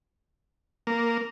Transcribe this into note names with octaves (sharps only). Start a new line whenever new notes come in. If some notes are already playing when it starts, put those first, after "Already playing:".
A#3